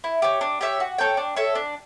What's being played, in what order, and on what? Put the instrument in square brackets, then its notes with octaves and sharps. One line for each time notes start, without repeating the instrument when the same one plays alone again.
[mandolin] E4
G4 C#5
D4
G4 C#5 E5
F#4
A4 C#5 G5
D4
A4 C#5 E5
D4